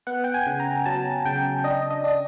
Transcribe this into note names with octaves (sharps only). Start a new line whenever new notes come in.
B3 F#5
G5
G#5
C#3
A#5
F#3 A5
C#3 G5
D4 D#5
D#5
D4